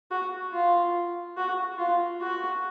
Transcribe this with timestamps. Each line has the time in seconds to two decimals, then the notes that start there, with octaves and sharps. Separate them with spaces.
0.11 F#4
0.53 F4
1.37 F#4
1.78 F4
2.21 F#4